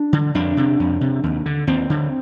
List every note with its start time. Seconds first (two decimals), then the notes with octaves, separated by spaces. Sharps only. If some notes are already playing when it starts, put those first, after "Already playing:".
Already playing: D4
0.13 D3
0.34 F2 D4
0.57 C3
0.80 F2
1.01 C3
1.23 D#2
1.46 D3
1.67 D#2 C4
1.90 D3